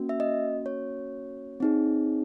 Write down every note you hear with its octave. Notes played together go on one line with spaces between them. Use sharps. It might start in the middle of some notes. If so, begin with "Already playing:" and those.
Already playing: A#3 C#4 F#4
E5
D#5
C#5
C4 D#4 G#4